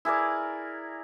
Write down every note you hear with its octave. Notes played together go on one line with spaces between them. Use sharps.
E4 G#4 A#4 D5